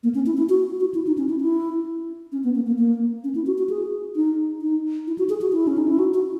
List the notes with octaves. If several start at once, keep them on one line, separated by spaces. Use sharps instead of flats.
A#3
C#4
E4
E4
F#4
F#4
E4
D#4
C#4
E4
E4
C#4
B3
A#3
A#3
A#3
C#4
E4
F#4
F#4
G#4
D#4
D#4
E4
F#4
G#4
F#4
E4
C#4
D#4
E4
F#4
F#4